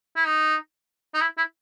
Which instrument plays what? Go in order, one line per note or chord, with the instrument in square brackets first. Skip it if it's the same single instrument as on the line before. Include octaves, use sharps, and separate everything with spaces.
[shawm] E4
D#4
D#4
E4
E4